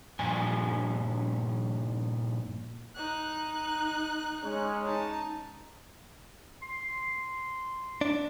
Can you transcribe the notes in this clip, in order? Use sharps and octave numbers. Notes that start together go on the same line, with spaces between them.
G2 A#2 F3 G#5
D#4 F#6
G#3 C#4
D#4 A5
C6
D4